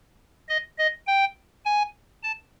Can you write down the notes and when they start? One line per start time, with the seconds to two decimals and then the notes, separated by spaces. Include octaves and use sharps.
0.49 D#5
0.78 D#5
1.07 G5
1.65 G#5
2.23 A5